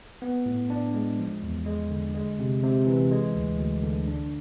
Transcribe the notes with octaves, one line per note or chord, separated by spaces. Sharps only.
B3
A2
D4
G#3
F3
E2
G#3
D3
G#3
C3
C3
E3
G#3
D2
D2
D3
D4